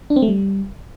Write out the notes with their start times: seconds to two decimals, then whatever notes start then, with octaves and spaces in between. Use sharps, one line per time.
0.10 D4
0.16 C4
0.22 A3
0.28 G3